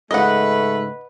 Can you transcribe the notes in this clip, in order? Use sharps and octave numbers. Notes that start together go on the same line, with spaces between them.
G#2 C#3 A3 B4 D#5 F#5